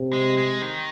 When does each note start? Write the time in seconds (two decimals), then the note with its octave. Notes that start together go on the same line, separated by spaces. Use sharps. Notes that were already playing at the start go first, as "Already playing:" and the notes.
Already playing: C3
0.13 G#3
0.38 G#3
0.62 D#3